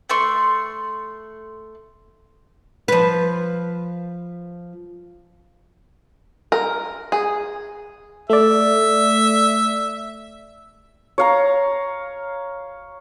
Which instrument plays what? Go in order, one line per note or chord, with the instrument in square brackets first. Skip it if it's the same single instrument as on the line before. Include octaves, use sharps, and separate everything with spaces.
[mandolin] A3 D5 C6 C#6
[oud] F3 B4
[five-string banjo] A#4
G#4
[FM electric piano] A3 D5 [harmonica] E5
[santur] C#5 F5 A#5